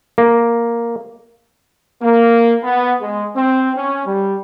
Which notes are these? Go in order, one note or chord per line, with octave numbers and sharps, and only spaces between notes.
A#3
A#3
B3
G#3
C4
C#4
G3